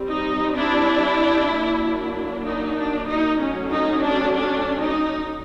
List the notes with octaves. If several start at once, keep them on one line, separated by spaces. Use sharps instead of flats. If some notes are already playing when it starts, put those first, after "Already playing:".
Already playing: G3 C4
D#4
D4 E4
F#3 A#3 D4
D#4
D4
D#4
F#3 A3 C#4
D#4
D4
D4
D#4